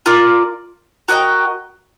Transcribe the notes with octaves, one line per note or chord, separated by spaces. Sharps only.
F4 A#4 D5
F#4 A#4 D#5 G5